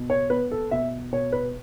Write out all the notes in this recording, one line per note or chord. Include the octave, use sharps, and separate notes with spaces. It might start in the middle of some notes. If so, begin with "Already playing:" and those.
Already playing: B2
C#5
B3 B4
A4
B2 E5
B2 C#5
B4